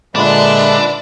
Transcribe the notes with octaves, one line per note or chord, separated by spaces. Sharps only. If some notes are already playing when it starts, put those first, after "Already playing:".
A#2 D3 G#3 D4 B4 D5 E5